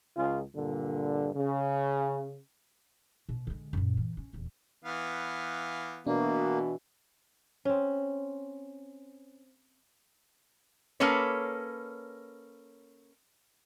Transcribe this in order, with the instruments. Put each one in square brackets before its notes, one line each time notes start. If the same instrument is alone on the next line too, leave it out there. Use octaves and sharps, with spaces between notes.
[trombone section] C#2 C#3 F4 G#4
G2 A#2 D3
C#3
[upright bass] B2
D3 G#3
F#2 A#2
E3
C#4
D#1 E2
[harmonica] E3 B3 F5
[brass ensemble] B2 E3 [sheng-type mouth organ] A#3 [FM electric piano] D4
[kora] C4 C#4
[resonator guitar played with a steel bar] A#3 C#4 A4 B4 C#5